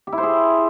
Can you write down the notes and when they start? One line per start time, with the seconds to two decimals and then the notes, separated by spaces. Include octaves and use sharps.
0.07 G4
0.12 E4
0.18 C5
0.23 G#4